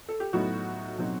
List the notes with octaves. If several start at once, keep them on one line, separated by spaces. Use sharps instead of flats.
A4
G4
A2 F#3 B3 D#4 F#4
B2 F#3 C4 D#4